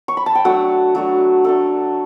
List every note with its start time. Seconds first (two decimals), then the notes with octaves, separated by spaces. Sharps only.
0.08 C#6
0.17 B5
0.26 A5
0.35 G5
0.45 F#3 A3 D4 F#5
0.95 F#3 A3 D4
1.44 F#3 A3 D4 A4